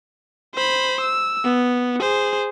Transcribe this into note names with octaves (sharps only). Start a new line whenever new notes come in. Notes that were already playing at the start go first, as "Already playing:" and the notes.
C5 B5
E6
B3
G#4 C5